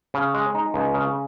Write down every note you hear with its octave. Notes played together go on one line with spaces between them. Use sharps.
C#3
G#3
D#4
C#2
C#3